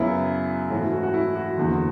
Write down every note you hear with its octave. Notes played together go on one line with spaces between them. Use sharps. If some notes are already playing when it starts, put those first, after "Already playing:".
Already playing: F#2 C#3 F#3 B3 E4
G#2 E3 A3 C#4 F#4
E4
F#4
F#4
E4
F#4
F#1 E2 D3